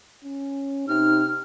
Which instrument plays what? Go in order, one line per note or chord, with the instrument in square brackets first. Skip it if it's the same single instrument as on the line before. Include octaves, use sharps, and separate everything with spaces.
[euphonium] C#4
[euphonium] C3 [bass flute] D#4 [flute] F6